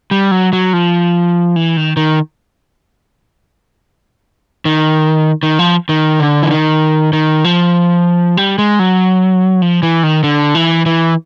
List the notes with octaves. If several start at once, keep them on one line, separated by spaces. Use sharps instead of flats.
G3
F#3
F#3
F3
E3
D#3
D#3
D#3
D#3
F3
D#3
D3
E3
D#3
D#3
F3
G3
G#3
F#3
F3
E3
D#3
D3
E3
E3